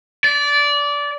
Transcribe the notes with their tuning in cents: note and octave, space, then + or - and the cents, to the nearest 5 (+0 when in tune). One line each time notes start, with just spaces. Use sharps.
D5 -20